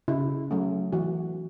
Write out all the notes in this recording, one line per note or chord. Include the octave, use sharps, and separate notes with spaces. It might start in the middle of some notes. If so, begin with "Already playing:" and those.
C#3 E4
F#3 A3 C#4
E3 F#4